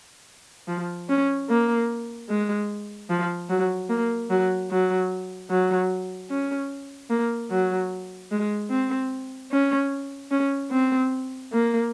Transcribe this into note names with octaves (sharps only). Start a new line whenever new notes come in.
F3
C#4
A#3
G#3
F3
F#3
A#3
F#3
F#3
F#3
C#4
A#3
F#3
G#3
C4
C#4
C#4
C4
A#3